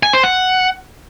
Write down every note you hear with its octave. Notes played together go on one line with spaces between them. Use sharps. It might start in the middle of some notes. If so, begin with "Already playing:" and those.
G#5
C5
F#5